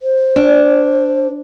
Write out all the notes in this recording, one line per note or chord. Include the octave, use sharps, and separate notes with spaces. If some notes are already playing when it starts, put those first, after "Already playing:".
C5
D4